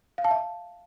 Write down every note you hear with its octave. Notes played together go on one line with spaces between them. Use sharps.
F5
A5
E5